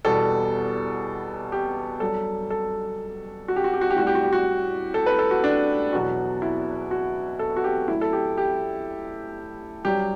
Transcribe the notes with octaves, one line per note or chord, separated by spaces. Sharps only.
E2 B2 G3 A4
G4
G2 F#3 A4
A4
F#4
G4
F#4
G4
F#4
G4
A2 G3 F#4
G4
F#4
G4
F#4
A4
B4
A4
F#4
D4
E2 B2 F#3 F#4
E4
F#4
A4
F#4
G4
A2 F#3 E4
A4
G4
G4
G2 F#3 G4